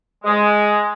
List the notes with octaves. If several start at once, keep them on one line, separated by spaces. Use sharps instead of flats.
G#3